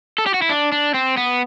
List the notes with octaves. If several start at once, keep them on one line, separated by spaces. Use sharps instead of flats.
A4
G4
F#4
E4
D4
D4
C4
B3